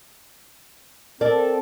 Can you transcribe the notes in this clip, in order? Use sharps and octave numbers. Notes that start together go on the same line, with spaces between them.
C4 A4 A#4 D5